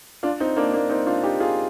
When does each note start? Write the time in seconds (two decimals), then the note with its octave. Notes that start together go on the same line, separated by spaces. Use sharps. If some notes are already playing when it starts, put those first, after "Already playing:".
0.23 D4 F4
0.40 C4 D#4
0.56 A#3 D4
0.73 A#3 D4
0.90 C4 D#4
1.07 D4 F4
1.23 D#4 G4
1.40 F4 G#4